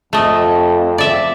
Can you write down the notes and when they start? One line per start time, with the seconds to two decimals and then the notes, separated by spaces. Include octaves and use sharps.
0.13 F2 A3 D#5
0.98 D5 E5